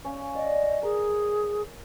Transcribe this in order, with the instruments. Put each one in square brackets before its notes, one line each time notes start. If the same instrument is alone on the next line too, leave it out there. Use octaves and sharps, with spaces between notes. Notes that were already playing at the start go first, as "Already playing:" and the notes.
[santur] C#4 F5
[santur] D5 [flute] D#5
[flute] G#4 [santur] A#4